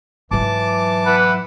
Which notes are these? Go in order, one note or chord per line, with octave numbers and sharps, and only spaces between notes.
G#2 E3 F#3 A5 D6
E4 B4 F#5